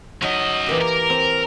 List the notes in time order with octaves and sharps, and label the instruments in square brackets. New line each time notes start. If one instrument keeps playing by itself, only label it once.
[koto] F#3 D#4 [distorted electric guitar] C#4 D#5
[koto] E3 A#3 G4
[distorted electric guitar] A#4
[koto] C4